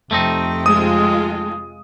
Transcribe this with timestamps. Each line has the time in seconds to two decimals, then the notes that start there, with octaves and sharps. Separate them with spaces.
0.11 F2 C3 A3 C4 D#4 G5
0.66 G#3 F4 D#6